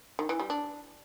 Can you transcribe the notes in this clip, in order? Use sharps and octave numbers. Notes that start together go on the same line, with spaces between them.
D#3
E3
G3
D4